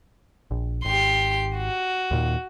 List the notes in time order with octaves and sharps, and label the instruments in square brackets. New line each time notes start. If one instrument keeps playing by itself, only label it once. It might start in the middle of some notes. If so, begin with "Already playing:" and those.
[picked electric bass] A#1
[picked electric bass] G#1 [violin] G4 C6
[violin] F#4
[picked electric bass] D#2 A#2 D#3